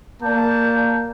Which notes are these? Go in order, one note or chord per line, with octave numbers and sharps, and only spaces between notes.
A#3 D5 A5 G6